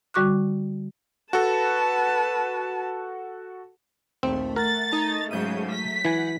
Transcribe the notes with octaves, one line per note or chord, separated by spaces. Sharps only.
D3 G3 F#4 C#6 D6 F#6
F#4 A4 B4 A5
A#1 D#2 A3 C4
A#4 F#5 A6
D#4 A5 A#5
G#2 C#3 F#3 G6 D#7
B6
E3 F#5 G#5